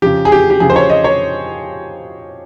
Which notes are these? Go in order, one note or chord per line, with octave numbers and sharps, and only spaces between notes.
F2 C#3 G4
G#4
G4
G4
F2 C#3 G#4
C5
C#5
D#5
C#5